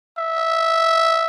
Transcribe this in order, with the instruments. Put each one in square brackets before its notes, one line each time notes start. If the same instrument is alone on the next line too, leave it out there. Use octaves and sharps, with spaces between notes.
[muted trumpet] E5